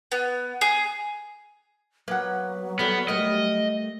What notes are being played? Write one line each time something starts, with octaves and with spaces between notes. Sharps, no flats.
B3
G#4
F#3 A#3 B3 A#4 F#5
G3 B3 A4 D5
G3 A3 A#4 D#5